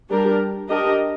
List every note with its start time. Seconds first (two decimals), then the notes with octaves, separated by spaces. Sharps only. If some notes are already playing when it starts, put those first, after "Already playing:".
0.11 G3 D4 G4 A#4
0.69 D4 G4 A#4 D#5